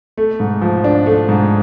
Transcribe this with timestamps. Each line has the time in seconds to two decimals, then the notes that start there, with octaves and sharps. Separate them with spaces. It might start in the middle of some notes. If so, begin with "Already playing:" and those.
0.17 A3
0.40 G#2
0.62 F3
0.84 D4
1.06 A3
1.29 G#2